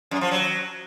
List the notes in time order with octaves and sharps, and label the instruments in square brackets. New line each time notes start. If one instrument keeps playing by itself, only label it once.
[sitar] F#2
F3
F#3